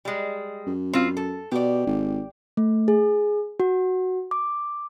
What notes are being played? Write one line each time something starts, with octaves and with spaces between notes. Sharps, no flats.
G3 G#3
F#2
C4 F4
A4
B2 G4 D5
G#1
A3
G#4
F#4
D6